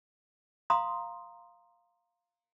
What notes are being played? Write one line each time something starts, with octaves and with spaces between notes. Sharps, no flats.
F5 A#5 C6 D#6